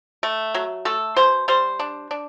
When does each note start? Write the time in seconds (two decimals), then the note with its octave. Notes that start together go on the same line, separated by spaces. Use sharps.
0.23 A3
0.54 F#3
0.85 A3 A4
1.16 B2 C5
1.48 G3 C5
1.79 D4
2.11 D4